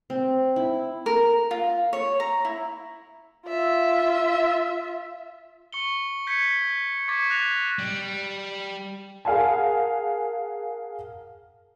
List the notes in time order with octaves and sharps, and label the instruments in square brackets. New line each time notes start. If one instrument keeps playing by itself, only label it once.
[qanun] C4
E4
[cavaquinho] A#4
F4
C#5
A#5
E4
[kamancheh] F4 E5
[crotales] C#6 C#7 G7
G6 G#6 B6 C#7
C#6 D6 G#6 A6 B6 C#7
F#6 A#6 C7 F7
[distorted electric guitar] G3
[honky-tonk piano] G#4 A#4 F5 F#5 G#5 A5